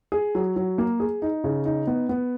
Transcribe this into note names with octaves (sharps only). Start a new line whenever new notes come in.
G#4
F#3
F#3
A#3
G#4
D#4
C#3
D#4
B3
B3